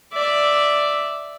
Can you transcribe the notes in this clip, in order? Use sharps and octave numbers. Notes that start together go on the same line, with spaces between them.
D5 E5